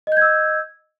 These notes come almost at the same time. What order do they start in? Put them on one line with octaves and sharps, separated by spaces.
D#5 G6 G#6 E6